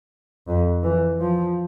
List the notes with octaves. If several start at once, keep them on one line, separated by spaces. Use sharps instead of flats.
F2
E3
F3